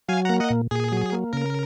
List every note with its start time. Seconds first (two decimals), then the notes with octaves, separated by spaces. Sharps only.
0.09 F#3 F5 G#5
0.25 A#3 F#5 A#5
0.40 D#5 F#5
0.50 A#2
0.71 A#2 G#4
0.92 F#3
1.12 A#3
1.33 C#3 A#4